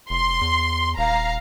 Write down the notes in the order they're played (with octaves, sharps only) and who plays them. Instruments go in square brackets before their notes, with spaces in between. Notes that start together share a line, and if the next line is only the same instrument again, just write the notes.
[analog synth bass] F1 [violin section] C6
[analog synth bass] E2
[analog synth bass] D#1 [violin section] F5 A#5